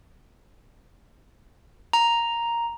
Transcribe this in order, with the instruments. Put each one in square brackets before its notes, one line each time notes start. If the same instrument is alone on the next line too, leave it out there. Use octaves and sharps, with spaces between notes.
[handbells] A#5